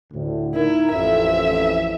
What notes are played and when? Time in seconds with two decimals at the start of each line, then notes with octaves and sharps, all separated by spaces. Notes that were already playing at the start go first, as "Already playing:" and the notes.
0.12 D2 A2 D3
0.55 D#4 E4 A#4
0.92 A1 F2 E5